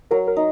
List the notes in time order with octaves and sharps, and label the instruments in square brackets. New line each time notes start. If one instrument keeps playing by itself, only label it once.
[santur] F#3 [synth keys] A#4
[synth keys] A#4
[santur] D#4